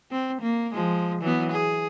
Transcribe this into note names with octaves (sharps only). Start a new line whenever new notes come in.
C4
A#3
F3 G#3
E3 F#3 B3
G#4